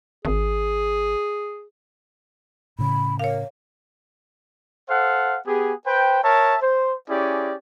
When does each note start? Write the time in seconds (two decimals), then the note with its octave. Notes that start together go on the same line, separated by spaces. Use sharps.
0.25 G#1 G#4
2.79 A2 C#3 B5
3.19 A#4 C#5 F5
4.89 A4 C5 F5 F#5
5.47 B3 G4 G#4
5.87 B4 C5 G5
6.24 A#4 C#5 E5 A5
6.62 C5
7.09 C#4 E4 G4 G#4 D5